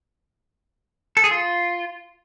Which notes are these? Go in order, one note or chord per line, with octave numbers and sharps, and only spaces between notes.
A4
G#4
F4